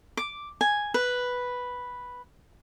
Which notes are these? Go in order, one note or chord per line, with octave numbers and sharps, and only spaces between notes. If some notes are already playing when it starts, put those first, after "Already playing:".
D6
G#5
B4